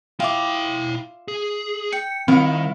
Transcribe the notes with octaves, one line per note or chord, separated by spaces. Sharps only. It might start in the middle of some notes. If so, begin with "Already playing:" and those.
E4 F4 E5 G5 D6
G#4
G5 C#7
D#3 G3 C4 E4 E5 F5